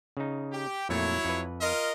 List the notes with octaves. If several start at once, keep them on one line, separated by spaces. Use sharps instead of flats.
C#3 D#4
G4
F2 A#2 F#3 A3 E4 C#5
F2 B4
F4 A#4 D#5